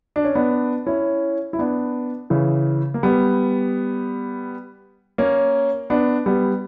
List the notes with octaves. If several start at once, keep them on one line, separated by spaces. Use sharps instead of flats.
D4
C#4
B3 D4
C#4 E4
E4
B3 D4
C#3 E3
A#3
G3 B3
A#3 C#4
B3 D4
G3 B3